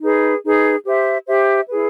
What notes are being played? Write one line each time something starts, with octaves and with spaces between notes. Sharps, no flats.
D#4 G#4 B4
D#4 G#4 B4
G4 C5 E5
G4 C5 E5
E4 G#4 B4